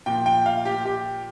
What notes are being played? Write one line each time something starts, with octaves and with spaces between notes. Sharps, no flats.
A#2 F3 G5
G5
F5
G4
G4